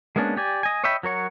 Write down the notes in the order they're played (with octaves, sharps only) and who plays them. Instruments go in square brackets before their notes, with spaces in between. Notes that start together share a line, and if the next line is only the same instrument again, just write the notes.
[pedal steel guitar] G#3 A#3 B3 C#4 D4
G4 D5 G#5
D#5 G#5
C#5 D#5 E5 G5 B5
F#3 A#4 C#5 F#5